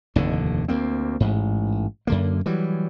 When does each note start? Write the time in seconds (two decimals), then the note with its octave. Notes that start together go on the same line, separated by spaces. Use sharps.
0.16 F1 D#2 A2 D3
0.68 D2 A#3 C4
1.20 A1 G#2
2.07 F#2 D3 A#3
2.46 E3 F#3 G3